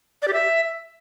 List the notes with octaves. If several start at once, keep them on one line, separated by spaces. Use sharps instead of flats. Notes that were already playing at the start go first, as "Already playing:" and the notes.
D5
G4
E5